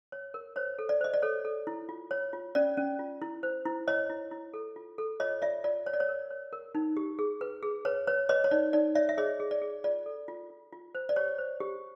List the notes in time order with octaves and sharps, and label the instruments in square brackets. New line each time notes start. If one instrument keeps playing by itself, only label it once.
[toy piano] C#5
A#4
C5 C#5
A4
D5
C5 D#5
D5
A4 C#5
A4
E4
F4
C#5
F4
C#4 D5
C#4
F4
E4
C5
E4
E4 C#5 D#5
E4
E4
A4
F4
A4
F4 C#5 D#5
F4 D5 E5
F4 D5
C#5
D5
C#5
A#4
C#5
A#4
D#4
G4
G#4
B4
G#4
B4 C#5
B4 C#5
B4 C#5 D#5
C#5
D#4 D5
D#4 D5
C#5 D5 E5
E5
G#4 C#5 D#5
G#4
D5
G#4
F4 D5
A4
F4
F4
F4
C5
D5
G4 C#5
C5
G4